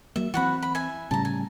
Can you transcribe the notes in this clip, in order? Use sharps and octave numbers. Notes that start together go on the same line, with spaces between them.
F#3 A#3 E5
E3 C4 F#4 F#5 B5
B5
E5 G#5
A2 C#3 G3 A5 A#5
G#5